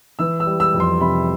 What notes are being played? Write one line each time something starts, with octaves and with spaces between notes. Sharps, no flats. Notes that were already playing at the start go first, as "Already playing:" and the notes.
E3 E6
E6
G3
E6
F2
C6
C3 B5